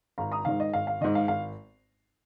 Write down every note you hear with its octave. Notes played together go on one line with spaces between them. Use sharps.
G#1 F5 A#5
A#5 D#6
G#2 D#3 F5
D#5
G#1 F5
F5
G#2 D#3 D#5
F5
G#1 F5